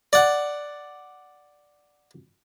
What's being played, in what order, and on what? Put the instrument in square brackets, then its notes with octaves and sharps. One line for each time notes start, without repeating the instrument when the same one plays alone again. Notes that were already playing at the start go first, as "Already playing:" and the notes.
[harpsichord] D5 F#5